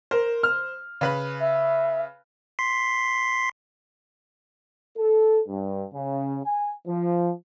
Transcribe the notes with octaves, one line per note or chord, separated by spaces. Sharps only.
A#4 C5
F6
C#3 B4 B5
E5
C6 B6 C7
A4
G2
C#3
G#5
F3